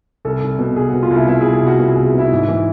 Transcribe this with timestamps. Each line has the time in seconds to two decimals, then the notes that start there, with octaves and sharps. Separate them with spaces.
0.25 C2 A4
0.42 C2
0.59 B2
0.76 C2 G#4
0.89 F#4
0.93 B2
1.03 F4
1.11 C2 E4
1.27 B2 E4
1.41 G#4
1.45 C2
1.53 G#4
1.63 C2 F#4
1.79 B2 F#4
1.92 G#4
1.96 C2
2.05 G#4
2.14 B2 E4
2.32 G#2
2.48 E3